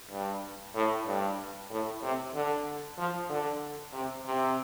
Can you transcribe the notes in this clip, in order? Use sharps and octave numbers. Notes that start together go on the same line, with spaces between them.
G2
A2
G2
A2
C3
D3
F3
D3
C3
C3